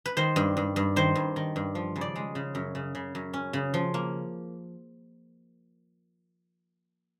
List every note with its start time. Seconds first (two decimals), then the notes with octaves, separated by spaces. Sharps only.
0.06 B4
0.17 D#3 C5
0.36 G2
0.57 G2
0.76 G2
0.96 D#3 C5
1.15 G2
1.36 D#3
1.56 G2
1.75 F3
1.96 C#3
2.01 D5
2.16 G#3
2.35 C#3
2.55 F#2
2.75 C#3
2.95 C#3
3.15 F#2
3.34 C#4
3.53 C#3
3.74 F3
3.94 A#3